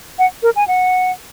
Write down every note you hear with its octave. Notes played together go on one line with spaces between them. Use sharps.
F#5
A#4
G#5
F#5